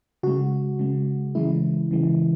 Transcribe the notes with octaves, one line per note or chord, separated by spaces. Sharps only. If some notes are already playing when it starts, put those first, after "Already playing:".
C#3 G#3 F#4
C#3 G#3
C#3 E3 G#3 E4
C#3 E3 G#3